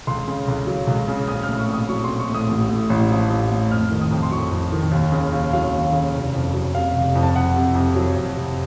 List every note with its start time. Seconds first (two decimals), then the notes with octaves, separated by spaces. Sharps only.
0.07 C#2 C6
0.28 C#3
0.48 C#2
0.67 F#3
0.87 C#2
1.08 C#3
1.28 A#1 D#6
1.43 F6
1.49 A2
1.59 C#6
1.68 A#1
1.74 D#6
1.89 F#3 C#6
2.04 A#1 C6
2.20 C#6
2.30 A2 D#6
2.49 A1
2.69 A2
2.90 A1
3.10 F3
3.30 A1
3.51 A2
3.71 F2 F6
3.91 D#3
4.01 D#6
4.11 F2
4.23 C6
4.31 F#3 C#6
4.52 F2
4.72 D#3
4.92 D#2
5.12 C#3
5.33 D#2
5.53 F#3 F5
5.73 D#2
5.93 C#3
6.14 F1
6.34 F2
6.54 F#3
6.74 C3 F5
6.94 F1
7.15 F2
7.23 A5
7.35 F2 F#5
7.56 C3
7.75 F2
7.96 F#3
8.16 F2
8.37 C3